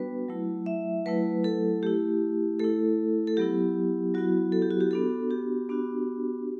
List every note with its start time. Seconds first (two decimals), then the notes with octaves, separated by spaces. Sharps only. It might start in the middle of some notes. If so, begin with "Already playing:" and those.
Already playing: G3 B3 D4 F#4 B4
0.28 F#3 A3 E4
0.66 E5
1.06 F#3 A3 E4 B4
1.44 A4
1.83 A3 E4 G4
2.59 A3 E4 A4
3.27 A4
3.37 F#3 B3 E4 G4
4.14 F#3 B3 E4 F#4
4.52 A4
4.62 G4
4.71 F#4
4.80 G4
4.91 B3 D4 F#4 A4
5.31 G4
5.69 B3 D4 F#4